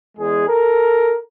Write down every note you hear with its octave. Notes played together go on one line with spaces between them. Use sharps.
E2 G#3 G#4
A4 A#4